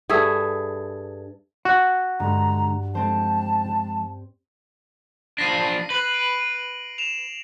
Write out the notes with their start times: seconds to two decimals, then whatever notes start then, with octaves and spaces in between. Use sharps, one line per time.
0.09 G2 G#4 A4 E5
1.65 F#4 F#5
2.20 G2 D3 G#3 A#5
2.95 F3 G#3 C4 C5 A5
5.38 F3 D4 A#6 C7 D#7
5.90 B4 F#7
6.14 D7
6.98 E7 F7